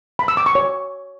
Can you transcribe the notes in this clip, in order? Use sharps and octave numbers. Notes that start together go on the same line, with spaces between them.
B5
E6
D6
C#6
C#5